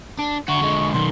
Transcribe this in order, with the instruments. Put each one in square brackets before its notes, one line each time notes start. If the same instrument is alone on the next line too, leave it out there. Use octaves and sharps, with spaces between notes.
[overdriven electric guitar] D4
[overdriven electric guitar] D3 F#4 [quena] C#6
[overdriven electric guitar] D3 G#3
[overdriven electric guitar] B1 D#3 [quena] C6